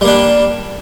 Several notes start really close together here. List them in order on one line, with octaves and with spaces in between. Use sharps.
G3 A#3 D4